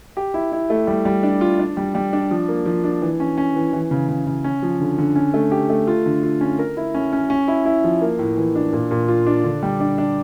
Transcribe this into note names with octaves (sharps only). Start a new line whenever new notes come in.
G4
E4
E4
A3
G3
G3
D4
F4
D4
G3
G3
D4
F3
A#3
F3
D4
E3
C#4
C#4
E3
E3
C#3
C#3
C#3
C#4
F3
D3
D3
C#4
A3
G4
A3
F4
D3
F4
C#4
A#4
E4
C#4
C#4
C#4
E4
E4
F3
A#3
A2
E3
D4
A#2
A#2
F4
D4
D3
G3
D4
D4